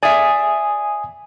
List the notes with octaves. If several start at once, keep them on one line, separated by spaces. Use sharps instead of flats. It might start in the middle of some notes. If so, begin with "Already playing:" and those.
D5 E5 G#5 D#6